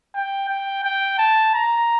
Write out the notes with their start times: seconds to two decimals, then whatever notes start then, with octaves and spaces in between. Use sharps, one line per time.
0.15 G5
0.49 G5
0.84 G5
1.18 A5
1.54 A#5